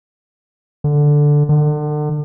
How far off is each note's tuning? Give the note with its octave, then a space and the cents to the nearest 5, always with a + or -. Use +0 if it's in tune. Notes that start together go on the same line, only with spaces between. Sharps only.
D3 +0
D3 +35